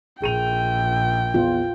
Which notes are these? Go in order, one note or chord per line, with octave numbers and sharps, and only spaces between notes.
A#1 G#4 G5 D#7 F7
E2 F4